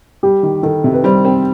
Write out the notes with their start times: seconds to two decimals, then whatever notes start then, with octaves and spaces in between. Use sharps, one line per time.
0.23 G3 G4
0.43 D#3
0.63 D#3 A4
0.84 C3
0.93 B4
1.04 G3 C5
1.25 C4